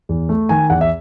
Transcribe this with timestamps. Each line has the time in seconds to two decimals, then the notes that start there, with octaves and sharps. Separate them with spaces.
0.09 E2
0.29 A3
0.49 D#3 G#5
0.70 E2 F#5
0.81 E5